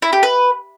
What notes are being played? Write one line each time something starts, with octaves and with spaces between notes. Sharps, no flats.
E4
G4
B4